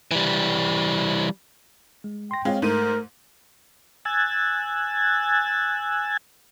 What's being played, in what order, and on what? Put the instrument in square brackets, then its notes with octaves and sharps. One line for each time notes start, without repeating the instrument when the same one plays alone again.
[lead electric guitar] E3 G3
[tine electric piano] G#3
[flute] G5 [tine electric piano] C6 A#6
[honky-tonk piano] G#3 F4 [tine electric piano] C4 C#5
[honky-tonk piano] G#2 D#7 [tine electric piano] A3 [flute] A#4
[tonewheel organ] G#5 E6 F#6 G#6 A6